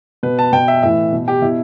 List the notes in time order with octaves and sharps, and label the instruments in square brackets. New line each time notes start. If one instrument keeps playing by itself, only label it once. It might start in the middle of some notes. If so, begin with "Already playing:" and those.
[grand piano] B2 B4
A5
B2 G5
E5
A2 E3 E5
B2
G4
B2 E4